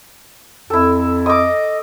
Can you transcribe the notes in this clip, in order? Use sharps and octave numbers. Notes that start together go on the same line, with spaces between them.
F2 E4 A4
D#5 D6 D#6